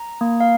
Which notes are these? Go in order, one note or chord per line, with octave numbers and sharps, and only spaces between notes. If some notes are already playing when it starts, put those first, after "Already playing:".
Already playing: A#5
A#3
F5